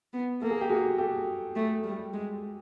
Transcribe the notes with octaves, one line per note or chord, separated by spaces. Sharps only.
B3
A#3 A4
G#4
G4
F#4 G#4
G4 A4
A3
G3
G#3